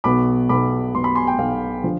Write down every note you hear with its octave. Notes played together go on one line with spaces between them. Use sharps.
B1 B2 B3 B5 D6
B1 B2 B3 B5 D6
B1 B2 B3 C6
B5
G#5 C6
G5
B1 B2 B3 F5
D3 F3